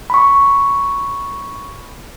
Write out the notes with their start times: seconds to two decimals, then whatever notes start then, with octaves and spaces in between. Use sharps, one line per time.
0.10 B5 C#6